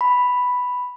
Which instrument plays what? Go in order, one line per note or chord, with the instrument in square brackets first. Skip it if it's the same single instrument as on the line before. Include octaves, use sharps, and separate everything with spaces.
[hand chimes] B5